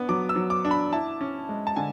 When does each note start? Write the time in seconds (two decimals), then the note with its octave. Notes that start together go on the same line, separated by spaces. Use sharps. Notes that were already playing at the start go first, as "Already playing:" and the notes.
Already playing: B3 D4
0.09 F#3 D6
0.29 E6
0.36 F#3
0.50 D6
0.65 D4
0.71 B5
0.92 E4 A5
1.21 C#4
1.49 G#3
1.67 A5
1.76 D3 G#5